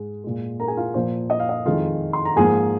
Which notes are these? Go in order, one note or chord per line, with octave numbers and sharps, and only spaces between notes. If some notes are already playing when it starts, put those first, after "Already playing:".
Already playing: G#2 G#3
A#2 G#3
A#4 A#5
G#4 G#5
F4 F5
A#2 F3 A#3 C5
D#5
F5
D#5
F2 D#3 G#3 F4 F5
C6
A#5
G#2 F3 A#3 G#4 G#5